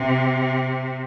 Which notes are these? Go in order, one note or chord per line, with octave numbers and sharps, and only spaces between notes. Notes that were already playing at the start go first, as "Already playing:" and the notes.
Already playing: C3